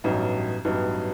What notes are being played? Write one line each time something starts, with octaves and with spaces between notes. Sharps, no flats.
A1 G2 F#3 B3 D#4
A1 G2 F#3 B3 D#4